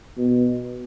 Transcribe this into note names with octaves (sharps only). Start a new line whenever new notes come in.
B2